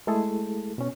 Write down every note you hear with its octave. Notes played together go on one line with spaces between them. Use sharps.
G#3 A3 E4 G#4 A4
B2 C#4